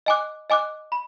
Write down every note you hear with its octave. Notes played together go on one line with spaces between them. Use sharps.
D#5 G#5 D6 F#6
D#5 G#5 D6 F#6
B5